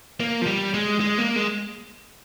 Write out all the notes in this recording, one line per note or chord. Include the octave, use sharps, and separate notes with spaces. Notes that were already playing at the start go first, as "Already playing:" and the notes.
A#3
F3
G3
G#3
G#3
A#3
G#3